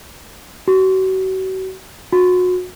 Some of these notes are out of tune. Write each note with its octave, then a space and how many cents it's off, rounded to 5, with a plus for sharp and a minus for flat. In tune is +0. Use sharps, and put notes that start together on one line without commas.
F#4 +35
F#4 -30